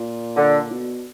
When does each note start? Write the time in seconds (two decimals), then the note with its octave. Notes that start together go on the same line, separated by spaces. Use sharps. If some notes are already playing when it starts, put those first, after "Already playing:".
Already playing: A#2
0.36 D3
0.71 B2